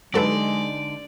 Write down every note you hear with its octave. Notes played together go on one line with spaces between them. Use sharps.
D3 F#3 G#3 D#4 G4 A4 B4 D5